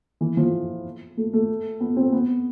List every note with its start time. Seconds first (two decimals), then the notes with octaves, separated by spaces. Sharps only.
0.21 E3
0.37 F3
1.17 A3
1.33 A3
1.80 B3
1.96 C4
2.13 B3